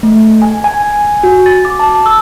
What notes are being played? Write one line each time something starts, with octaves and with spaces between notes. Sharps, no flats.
A3
G#5
G#5
F#4
A6
D6
A5
E6